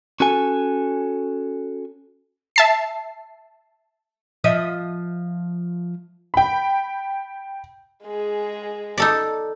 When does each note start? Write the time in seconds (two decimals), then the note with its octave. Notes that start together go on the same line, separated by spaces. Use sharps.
0.20 C#4 F#4 A4 G#5
2.56 E5 A5 C7
4.44 F3 D#5 E5
6.34 G5 B5
8.05 G#3 G#4
8.98 D#4 A4 D5